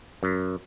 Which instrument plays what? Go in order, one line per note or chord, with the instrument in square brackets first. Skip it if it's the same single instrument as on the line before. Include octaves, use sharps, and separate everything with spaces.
[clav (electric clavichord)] F#2